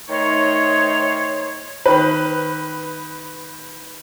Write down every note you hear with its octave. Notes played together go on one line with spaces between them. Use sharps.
D#3 A3 D#4 C5 C#5
D#3 B4